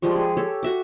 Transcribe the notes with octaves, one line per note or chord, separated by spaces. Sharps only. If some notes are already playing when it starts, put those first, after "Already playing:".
F3 G3 G#3 C#6
G#4
G4 A4 C#5
F#4 E5 D6